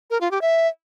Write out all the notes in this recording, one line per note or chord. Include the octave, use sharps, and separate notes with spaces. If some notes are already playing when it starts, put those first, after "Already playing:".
A#4
F4
G4
E5